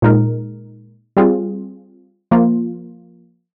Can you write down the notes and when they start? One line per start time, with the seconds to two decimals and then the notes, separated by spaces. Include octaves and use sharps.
0.02 A#2 G#3 D#4 A#4
1.17 G3 C4 F4 G#4
2.31 F3 A#3 F4